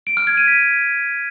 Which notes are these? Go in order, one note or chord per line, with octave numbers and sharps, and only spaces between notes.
D7
F6
G#6
D#7
B6